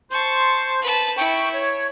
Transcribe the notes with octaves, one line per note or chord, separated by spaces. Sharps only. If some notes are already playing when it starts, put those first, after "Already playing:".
C5 A5 C#6
B4 A5
E4 G5 C#6
C#5